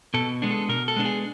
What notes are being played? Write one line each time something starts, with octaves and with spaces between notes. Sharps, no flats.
B2 A4
G#3 B3 D4
A4
B2 A#4
A4
G#3 B3 D4
G#4